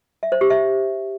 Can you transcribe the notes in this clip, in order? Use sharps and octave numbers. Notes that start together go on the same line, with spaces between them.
E5
C5
G4
E5